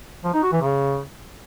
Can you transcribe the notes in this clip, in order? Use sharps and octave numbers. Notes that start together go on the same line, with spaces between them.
F3
D#4
F#4
E3
C#3